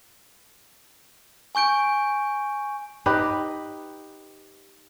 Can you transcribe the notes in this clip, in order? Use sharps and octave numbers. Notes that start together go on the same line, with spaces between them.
G#5 C#6 G6 D7
D#4 G4 B4